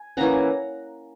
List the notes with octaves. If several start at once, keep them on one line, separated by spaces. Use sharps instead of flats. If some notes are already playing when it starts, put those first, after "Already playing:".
Already playing: G#5
E3 A#3 C#4 F#5 A#5